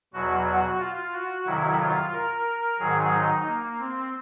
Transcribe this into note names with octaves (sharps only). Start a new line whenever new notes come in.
E2 B2 F#3 F#4
F#4
F4
F#4
F2 C3 D#3 F#3 E4
F4
A#4
G#2 D#3 F#3 G#4
D#4
A#3
C4